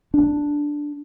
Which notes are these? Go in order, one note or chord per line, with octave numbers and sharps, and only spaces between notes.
D4